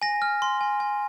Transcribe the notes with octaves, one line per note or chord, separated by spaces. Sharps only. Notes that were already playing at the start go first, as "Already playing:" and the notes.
G#5 A#6
F6
C6
G#5
G#5